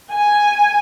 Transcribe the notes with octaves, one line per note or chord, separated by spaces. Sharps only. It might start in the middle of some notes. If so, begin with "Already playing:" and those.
G#5